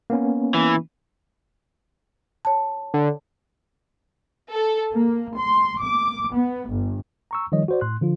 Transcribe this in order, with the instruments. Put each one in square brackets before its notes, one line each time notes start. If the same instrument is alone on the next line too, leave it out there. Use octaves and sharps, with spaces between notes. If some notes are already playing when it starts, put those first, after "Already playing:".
[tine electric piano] A#3 B3 C#4
[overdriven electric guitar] E3
[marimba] C#5 A5
[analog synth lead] D3
[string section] A4
A#3
C6
D6
B3
G1
[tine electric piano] A#5 C#6 E6
D#3 F3 G3 C#5 D#5
F#4 C5 D5
A2 C6 F#6
D3 F3 F4